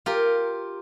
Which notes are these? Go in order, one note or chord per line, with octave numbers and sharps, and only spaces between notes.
F4 G4 A#4